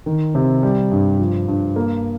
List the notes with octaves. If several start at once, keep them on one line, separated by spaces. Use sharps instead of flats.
D#3
C3
G3
G2
F3
G2
A#3